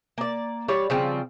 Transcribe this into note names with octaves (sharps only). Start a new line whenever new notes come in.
A#3 D5
G3 C#5 D5
C#3 F3 G3 C4